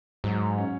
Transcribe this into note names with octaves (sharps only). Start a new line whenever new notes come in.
G#2 F#3
C#4